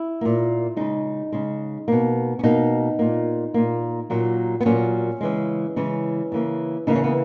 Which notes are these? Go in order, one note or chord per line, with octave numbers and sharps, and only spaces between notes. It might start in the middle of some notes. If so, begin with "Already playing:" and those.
Already playing: E4
A#2 A#3
C#3 G#3 D#4
C#3 G#3
B2 A#3
C#4
B2 A#3 D#4
A#2 A#3
A#2 A#3
A#2 F#3 A#3
B3
A#2 F#3 A#3 C#4
C#3 E3 G#3
C#3 E3 G#3 C#4
C#3 E3 A#3
C#3 E3 A#3 D#4
C#4
B3